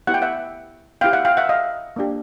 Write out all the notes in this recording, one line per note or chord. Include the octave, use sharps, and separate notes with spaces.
B3 E4 G4 F#5
G5
E5 F#5
B3 E4 G4 F5 G5
E5 F#5
F5 G5
E5 F#5
D#5 F5
A#3 D4 G4